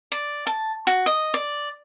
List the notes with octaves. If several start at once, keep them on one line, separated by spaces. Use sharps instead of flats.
D5
A5
F#4
D#5
D5